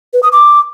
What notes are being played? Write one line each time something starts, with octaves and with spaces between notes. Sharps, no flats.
B4
D#6
D6